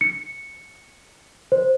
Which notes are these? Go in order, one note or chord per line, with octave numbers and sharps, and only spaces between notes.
C#7
C5